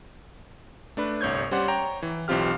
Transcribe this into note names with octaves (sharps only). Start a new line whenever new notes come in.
A3 D4 B4
G1 C2 C#5 G6 G#6
G3 C#4 G4 C5 D5 F#5
C#5 G5 A#5
E3
B1 E3 C4 F4 G4 F6